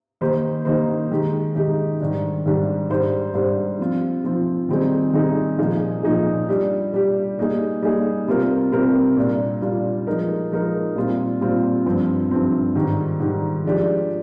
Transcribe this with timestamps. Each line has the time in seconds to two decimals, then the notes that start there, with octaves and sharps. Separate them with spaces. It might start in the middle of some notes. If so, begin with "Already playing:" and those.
0.21 D#3 A#3 D#4 G4 C5
0.65 D#3 A#3 D#4 G4 C5
1.11 D#3 G#3 D#4 G4
1.55 D#3 G#3 D#4 G4
2.00 G#2 D#3 G3 D4 G4
2.46 G#2 D#3 G3 D4 G4
2.90 G#2 G3 D4 G4 C5
3.34 G#2 G3 D4 G4 C5
3.79 F3 C4 F4
4.24 F3 C4 F4
4.69 D#3 G3 C4 D#4 G#4
5.13 D#3 G3 C4 D#4 G#4
5.58 A#2 F3 A#3 D#4 G#4
6.03 A#2 F3 A#3 D#4 G#4
6.49 G3 D4 G4
6.93 G3 D4 G4
7.38 G3 A#3 D#4 G#4
7.82 G3 A#3 D#4 G#4
8.27 C3 G3 C4 F4 A#4
8.72 C3 G3 C4 F4 A#4
9.16 A#2 G3 A#3 D4 F4
9.62 A#2 G3 A#3 D4 F4
10.07 F3 G#3 D#4 A#4
10.52 F3 G#3 D#4 A#4
10.96 A#2 G3 C4 F4
11.41 A#2 G3 C4 F4
11.86 G2 F3 C4
12.31 G2 F3 C4
12.75 G#2 D#3 G3
13.20 G#2 D#3 G3
13.65 F3 G#3 D4 G4